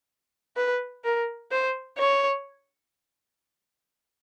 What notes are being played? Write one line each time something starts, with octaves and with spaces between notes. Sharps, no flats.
B4
A#4
C5
C#5